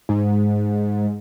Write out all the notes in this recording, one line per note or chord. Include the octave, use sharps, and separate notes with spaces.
G#2